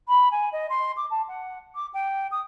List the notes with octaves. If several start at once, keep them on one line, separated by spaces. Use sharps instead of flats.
B5
G#5
D#5
C6
D6
A5
F#5
D6
G5
D#6